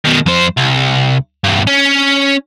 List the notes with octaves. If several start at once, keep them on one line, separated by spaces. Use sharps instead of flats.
B2 D#3
F2 C5
C2
E2 G2
C#4